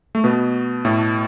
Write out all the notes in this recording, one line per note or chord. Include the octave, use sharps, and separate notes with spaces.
A3
B2 B3
A2 A3